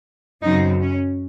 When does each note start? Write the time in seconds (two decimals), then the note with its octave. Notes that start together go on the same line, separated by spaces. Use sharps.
0.42 F#2 C#3 F#3 C4 D#4
0.80 C#4